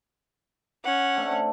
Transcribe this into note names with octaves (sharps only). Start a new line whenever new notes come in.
C#4 F#5
A3 C4 D4